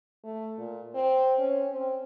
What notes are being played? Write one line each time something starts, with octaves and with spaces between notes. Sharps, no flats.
A3
A#2
C4
C#4
C4